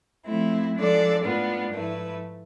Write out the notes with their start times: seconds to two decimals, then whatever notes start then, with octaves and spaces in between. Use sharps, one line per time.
0.27 F3 A3 C4 E4
0.75 F3 G#3 D4 A4 D5
1.23 A2 G#3 B3 D4 F4
1.72 G#2 F3 A3 E4 B4